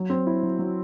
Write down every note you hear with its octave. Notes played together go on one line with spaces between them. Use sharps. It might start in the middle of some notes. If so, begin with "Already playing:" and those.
Already playing: F#3
C4
E4
F#3
F#3